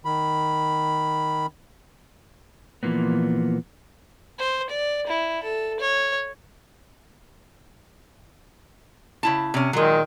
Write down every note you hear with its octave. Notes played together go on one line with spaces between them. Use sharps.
D#3 B5
A#2 E3 F3 A#3 B3
C5
D5
E4
A4
C#5
C#3 E4 A5
C3 C#4
A#2 D#3 F#3 G#3